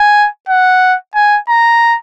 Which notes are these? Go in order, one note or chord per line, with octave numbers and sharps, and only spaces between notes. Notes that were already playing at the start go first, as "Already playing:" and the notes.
Already playing: G#5
F#5
G#5
A#5